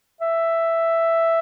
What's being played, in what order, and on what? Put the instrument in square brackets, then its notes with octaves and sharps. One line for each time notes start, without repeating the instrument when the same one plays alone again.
[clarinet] E5